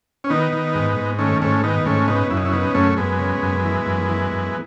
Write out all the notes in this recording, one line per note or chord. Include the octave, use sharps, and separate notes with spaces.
C#4
D#3 B3 D#4
D#3
G#2
G#2
D#3 A3 C#4
G#2 A3 C#4
D#3 B3 D#4
G#2 A3 C#4
C#3 B3 D#4
F#2 E4
D#4
C#4 E4
C#3 B3 D#4
F#2 A3 C#4
F#2 G#3 B3
C#3
F#2
E3
F#2
E3
F#2